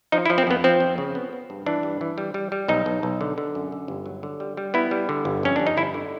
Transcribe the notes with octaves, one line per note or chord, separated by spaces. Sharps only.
F3 D#4
E4
F3
C4
F2 B3
F3 C4
F2
C#3
B3
B3
G2
E3 D4
G2
E3
G3
G3
G3
B1 D#4
B1
B1
D3
D3
F#2
D3
G1
F#3
D3
G3
G3
B3 E4
G3
D3
G1
F2 C#4
G1 D4
D#4
G1 E4
D3